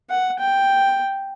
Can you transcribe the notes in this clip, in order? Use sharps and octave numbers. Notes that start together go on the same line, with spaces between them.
F#5
G5